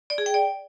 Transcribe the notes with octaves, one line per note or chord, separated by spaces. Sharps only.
D5
G#4
G5
D5